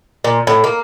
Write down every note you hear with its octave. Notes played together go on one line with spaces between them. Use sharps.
A#2
A2
A#3